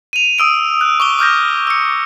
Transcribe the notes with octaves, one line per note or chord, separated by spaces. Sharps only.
D#7 F7
D#6 E6 D7
F#6
C#6 D6 G7
D6 F6 G6 A#6
E6 C#7